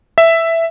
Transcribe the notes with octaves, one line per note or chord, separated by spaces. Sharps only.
E5